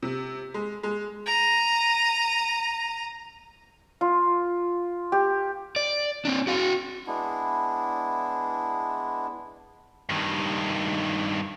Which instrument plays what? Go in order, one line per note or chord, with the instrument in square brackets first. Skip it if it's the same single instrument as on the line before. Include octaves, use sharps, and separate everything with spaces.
[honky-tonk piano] C3
G#3
G#3
[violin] A#5 D#7
[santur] F4
G4
[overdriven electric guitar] D5
C4 D4
F#4 F5
[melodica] G#3 B3 D4 E4
[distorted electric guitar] G2 D#3